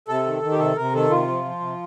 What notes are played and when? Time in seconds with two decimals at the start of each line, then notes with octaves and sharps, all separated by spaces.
0.08 C3 A4
0.26 D#3
0.42 D#3
0.52 G4
0.59 C3 A4
0.76 C3 A#4
0.93 D#3 A4
1.10 C3 F4
1.28 F3
1.44 F3
1.60 C3